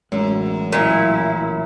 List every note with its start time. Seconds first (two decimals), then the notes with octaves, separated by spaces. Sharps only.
0.12 A1 F#2 A2 G#3
0.73 A#2 F#3 E4